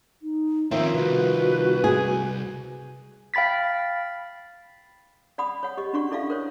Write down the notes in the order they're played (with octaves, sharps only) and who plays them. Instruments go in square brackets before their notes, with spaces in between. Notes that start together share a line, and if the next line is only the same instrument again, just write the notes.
[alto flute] D#4
[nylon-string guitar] D#3 F3 [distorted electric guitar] C4 C#4 [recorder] E5
[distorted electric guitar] C2 [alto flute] F#4 [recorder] B4
[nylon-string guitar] G#4
[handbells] F5 G5 B5 A6 B6
[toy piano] D5 F#5 B5 D#6
C#5 F#5
G4 D#5
C#4 D4 F#4 D5 F#5 C#6
E4 A4 D5 E5 F5
A#4 C5 C#5